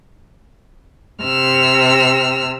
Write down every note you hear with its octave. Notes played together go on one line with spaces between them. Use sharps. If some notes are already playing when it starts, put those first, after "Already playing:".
C3 E6 F6